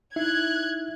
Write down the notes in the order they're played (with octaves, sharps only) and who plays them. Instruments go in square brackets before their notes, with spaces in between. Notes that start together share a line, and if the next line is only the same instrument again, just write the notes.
[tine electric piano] D#4 E4 E5 [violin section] F#6 G#6